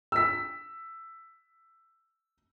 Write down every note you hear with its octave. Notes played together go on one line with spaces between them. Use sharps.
E6 B6